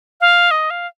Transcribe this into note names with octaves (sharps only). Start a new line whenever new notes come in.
F5
D#5
F5